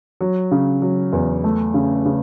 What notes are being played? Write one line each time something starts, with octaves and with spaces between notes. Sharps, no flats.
F#3
C#3
F#3
E2
A3
C#3
C#3